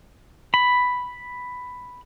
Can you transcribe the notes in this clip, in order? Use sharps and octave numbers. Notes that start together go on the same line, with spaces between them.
B5